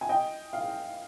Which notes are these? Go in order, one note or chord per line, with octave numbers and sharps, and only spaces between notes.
G#5
D#5 G5
F5